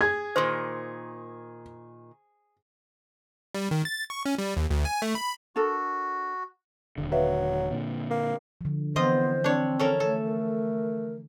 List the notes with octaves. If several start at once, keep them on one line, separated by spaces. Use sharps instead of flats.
G#4 G#6
A#2 D#3 C5 C6
G3
D#3
A6
C#6
C#4
G3
D#2
D2
G#5
A3
B5
D4 F#4 A4 A#4
D#1 G#1 D3
F#3 B4 E5 F5
A#2 D3
A#3
D3 F3
E3 B3 C4 F4 C5 D#5
C4 D4 C#5
C#4 A4 A#4 C#5
A3 A4
A#4